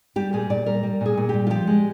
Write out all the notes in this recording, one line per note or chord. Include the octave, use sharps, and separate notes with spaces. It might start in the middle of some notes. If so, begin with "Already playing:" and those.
G3 G4
A#2 G#4
A#2 D5
G3 A#4
G3
A#2 G#4
A#2
G3 G4
F4
F3 G4
G#3